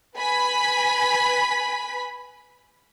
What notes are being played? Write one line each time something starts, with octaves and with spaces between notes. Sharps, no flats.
B4 G#5 B5 B6